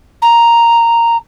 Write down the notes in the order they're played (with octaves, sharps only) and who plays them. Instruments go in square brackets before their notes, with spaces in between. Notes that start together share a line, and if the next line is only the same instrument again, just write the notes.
[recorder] A#5